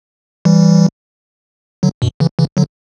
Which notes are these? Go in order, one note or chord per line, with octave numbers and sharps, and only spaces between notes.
E3 G3
D3 F#3
G2 B2
C#3 E3
C#3 E3
D3 F#3